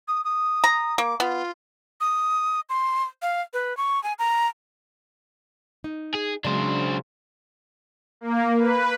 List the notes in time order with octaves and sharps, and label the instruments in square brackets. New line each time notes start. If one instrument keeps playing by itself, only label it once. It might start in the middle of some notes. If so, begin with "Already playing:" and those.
[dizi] D#6
D#6
[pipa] A#5
[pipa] A#3 [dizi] D6
[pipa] B3 [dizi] F4
[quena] D#6
C6
F5
B4
C#6
G#5
A#5
[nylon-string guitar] D#4
[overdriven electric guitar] G#4
[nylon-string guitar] C#3 F#3 G#3 [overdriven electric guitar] D4 C5
[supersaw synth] A#3
B4